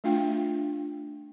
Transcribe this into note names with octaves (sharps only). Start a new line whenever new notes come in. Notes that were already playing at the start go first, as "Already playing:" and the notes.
A3 D4 F4 F5 G5